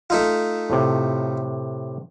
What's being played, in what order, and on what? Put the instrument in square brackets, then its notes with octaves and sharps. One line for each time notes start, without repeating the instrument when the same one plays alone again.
[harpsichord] A3 D#4 F4
[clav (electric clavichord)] A2 C3